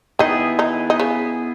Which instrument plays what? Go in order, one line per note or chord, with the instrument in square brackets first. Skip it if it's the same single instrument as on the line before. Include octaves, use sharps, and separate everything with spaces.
[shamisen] D#3 D#4 [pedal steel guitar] B3 E4 G#4
[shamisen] D#3 D#4
D#4
C#3 C#4